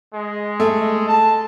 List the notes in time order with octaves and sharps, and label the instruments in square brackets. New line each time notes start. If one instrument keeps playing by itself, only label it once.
[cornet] G#3
[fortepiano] A3
[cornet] A5